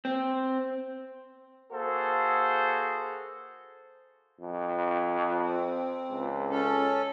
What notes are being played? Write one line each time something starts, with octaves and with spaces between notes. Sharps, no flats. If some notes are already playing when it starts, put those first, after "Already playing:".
C4
A#3 F#4 G#4 A4 C5
F2
C4
C#2
C#4 A4